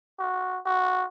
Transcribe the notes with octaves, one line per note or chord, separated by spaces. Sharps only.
F#4
F#4